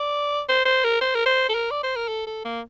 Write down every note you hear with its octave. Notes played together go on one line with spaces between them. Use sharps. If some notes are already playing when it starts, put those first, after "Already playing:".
Already playing: D5
C5
C5
A#4
C5
A#4
C5
A4
A#4
D5
C5
A#4
A4
A4
A#3